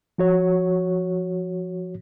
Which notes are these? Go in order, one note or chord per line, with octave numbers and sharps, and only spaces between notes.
F3 F#4 C#5